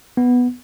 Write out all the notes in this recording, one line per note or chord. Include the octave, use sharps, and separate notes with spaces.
B3